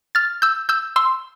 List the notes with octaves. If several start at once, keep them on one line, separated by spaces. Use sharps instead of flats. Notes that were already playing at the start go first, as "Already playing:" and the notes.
F6 A6
E6 G6
E6 G6
C6 E6